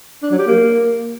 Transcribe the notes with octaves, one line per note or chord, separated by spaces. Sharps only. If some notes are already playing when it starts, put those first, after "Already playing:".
D4
F#3
G4
A#3